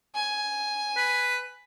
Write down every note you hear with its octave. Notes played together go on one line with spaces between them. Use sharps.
G#5
B4